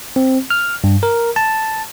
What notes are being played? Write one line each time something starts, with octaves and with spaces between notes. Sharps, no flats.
C4
F6
G2
A#4
A5